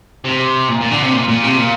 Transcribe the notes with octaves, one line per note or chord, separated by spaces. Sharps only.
C3
A#2
A#2
D3
C3
A#2
A#2
C3
A#2